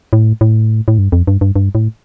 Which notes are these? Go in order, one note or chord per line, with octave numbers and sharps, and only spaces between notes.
A2
A2
A2
G2
F2
G2
G2
G2
A2